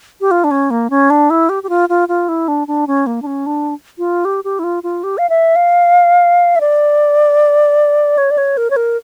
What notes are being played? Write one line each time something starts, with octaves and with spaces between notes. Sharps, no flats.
G4
F4
D4
C#4
A#3
C#4
D4
E4
G4
G4
F4
F4
F4
E4
D4
D4
C#4
A#3
D4
C#4
D4
F4
G4
G4
E4
F4
F4
G4
F5
E5
F5
E5
D5
C#5
D5
C#5
A#4
C#5
A#4